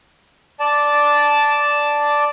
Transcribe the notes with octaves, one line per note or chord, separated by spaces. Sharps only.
D5 A5